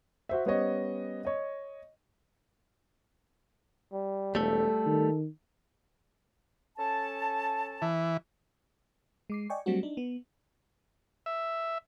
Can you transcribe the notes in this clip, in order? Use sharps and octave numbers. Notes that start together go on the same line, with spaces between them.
F#4 C5 E5
G3 B3 C#4 C5 C#5 D#5
C#5 D#5
G3
E1 G3 A3 A4
D#3
C#4 A4 A5
E3
G#3 D6 C7
D5 D#5 G5 G#5 C#6
F#3 G3 A3 C4 D4 F#4
D4 D#4
B3
E5